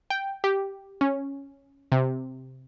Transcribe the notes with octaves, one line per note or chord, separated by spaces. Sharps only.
G5
G4
C#4
C3